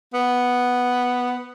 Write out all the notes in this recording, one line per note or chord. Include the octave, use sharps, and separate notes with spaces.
B3